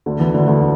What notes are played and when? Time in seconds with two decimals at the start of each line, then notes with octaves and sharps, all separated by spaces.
0.06 D2 D3
0.19 E2 E3
0.34 D2 D3
0.47 D2 D3